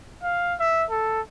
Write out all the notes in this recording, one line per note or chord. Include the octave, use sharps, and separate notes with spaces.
F5
E5
A4